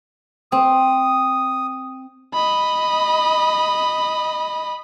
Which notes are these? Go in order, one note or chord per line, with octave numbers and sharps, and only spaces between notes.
C4 D#6
D#5 B5